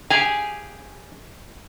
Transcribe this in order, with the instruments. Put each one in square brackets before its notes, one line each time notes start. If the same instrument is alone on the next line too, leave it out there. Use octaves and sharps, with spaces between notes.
[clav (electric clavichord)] G4 G#4 F5 [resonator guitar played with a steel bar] G#5